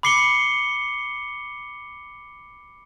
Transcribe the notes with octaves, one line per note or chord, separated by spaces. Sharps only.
B5 D6 C7 C#7 G7